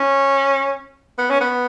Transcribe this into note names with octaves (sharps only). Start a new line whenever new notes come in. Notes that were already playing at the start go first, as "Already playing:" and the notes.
Already playing: C#4
B3
C#4
B3